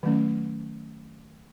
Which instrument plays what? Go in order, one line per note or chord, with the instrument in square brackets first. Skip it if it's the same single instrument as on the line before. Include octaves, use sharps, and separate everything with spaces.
[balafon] D#3 F#3 A3 C#4